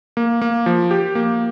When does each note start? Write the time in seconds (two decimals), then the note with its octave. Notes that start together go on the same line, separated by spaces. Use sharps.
0.17 A#3
0.41 A#3
0.66 F3
0.91 G4
1.15 A#3